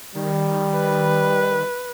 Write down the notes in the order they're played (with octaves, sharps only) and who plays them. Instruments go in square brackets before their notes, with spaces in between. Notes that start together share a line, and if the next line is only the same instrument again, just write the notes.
[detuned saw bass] D#3 [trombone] G3
[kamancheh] B4